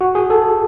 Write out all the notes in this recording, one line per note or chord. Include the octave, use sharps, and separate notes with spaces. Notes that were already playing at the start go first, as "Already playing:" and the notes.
F#4
G#4
A4